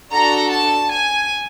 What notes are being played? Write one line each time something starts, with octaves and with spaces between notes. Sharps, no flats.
D4 F#4 A4 A#5
A5
G#5